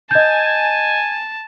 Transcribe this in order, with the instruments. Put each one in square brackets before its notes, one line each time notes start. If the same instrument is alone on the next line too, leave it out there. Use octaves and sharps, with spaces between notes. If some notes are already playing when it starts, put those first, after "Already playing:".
[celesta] D#5 G6 [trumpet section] G#5 [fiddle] A5